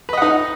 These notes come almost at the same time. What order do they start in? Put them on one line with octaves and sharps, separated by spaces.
B4 D#5 F#5 D#4